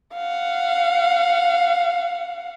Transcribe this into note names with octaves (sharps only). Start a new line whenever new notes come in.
F5 F#5